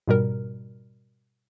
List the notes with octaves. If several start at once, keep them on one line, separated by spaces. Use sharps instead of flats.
G#2 B2 G3 A#4